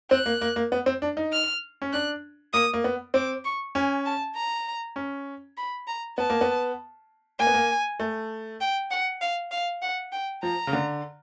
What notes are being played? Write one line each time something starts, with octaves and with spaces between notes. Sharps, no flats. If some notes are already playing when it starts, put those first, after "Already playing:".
C4 F#6
A#3
A#3
A#3
B3
C4
D4
D#4
F6
C#4
D4 F#6
A#3 D#6
A#3
B3
C4 D6
C#6
C#4 G#5
A5
A#5
C#4
B5
A#5
B3 A5
A#3
B3
A#3 G#5
B3
A#3
A3
G5
F#5
F5
F5
F#5
G5
F3 A#5
C#3
D3